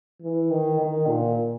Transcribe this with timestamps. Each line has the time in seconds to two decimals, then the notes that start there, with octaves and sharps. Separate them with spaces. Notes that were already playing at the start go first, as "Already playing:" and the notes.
0.22 E3
0.51 D#3
0.79 D#3
1.07 A#2